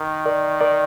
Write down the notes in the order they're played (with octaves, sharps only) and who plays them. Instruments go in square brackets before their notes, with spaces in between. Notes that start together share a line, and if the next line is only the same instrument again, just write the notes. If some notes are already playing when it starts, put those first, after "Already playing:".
Already playing: [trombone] D#3
[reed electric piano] A#4 D5
A#4 D5